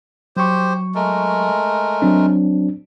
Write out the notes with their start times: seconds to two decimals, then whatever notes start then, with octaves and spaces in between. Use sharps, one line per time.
0.37 F#3 G4 C5 C#6
0.95 G#3 A3 A#4
2.02 F#3 C4 D4